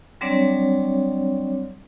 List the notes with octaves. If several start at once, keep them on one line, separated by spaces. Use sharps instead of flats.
F#3 G3 C4 D4 C#5 D5